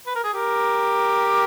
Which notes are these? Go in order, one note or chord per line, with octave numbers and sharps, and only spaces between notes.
B4
A#4
G#4
G4 A#4